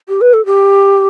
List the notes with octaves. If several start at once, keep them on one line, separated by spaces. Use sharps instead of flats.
G4
B4
A4
G4